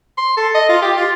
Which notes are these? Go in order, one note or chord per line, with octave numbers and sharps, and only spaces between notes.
C6
A4
D#5
F4
G4
F4